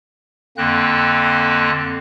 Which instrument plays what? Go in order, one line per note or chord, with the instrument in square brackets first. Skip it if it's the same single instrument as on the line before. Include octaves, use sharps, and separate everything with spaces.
[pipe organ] F2 D3 A#3 C4 F#6